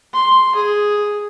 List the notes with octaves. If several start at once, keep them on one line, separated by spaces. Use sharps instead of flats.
C6
G#4